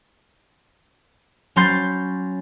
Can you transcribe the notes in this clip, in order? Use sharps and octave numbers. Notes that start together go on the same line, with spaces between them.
F#3 C#4 B5 C6 G6 A6